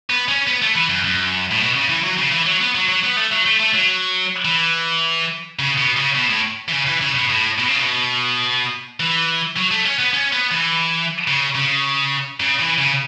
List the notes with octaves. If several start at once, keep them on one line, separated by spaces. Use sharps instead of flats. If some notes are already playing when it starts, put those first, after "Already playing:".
B3
C#4
B3
A3
E3
F#2
F#2
A2
B2
C#3
E3
F#3
C#3
E3
F#3
B3
F#3
F#3
B3
A3
F#3
A3
A3
F#3
E3
C#3
B2
C#3
B2
A2
E3
C#3
E3
C#3
B2
A2
B2
C#3
B2
E3
F#3
A3
C#4
B3
C#4
B3
E3
C#3
C#3
C#3
E3
C#3